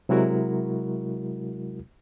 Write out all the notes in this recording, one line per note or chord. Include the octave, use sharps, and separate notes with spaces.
C3 F#3 G#3 E4 F#4 A#4